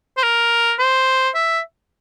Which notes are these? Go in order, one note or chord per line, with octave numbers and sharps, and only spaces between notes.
C5
A#4
C5
E5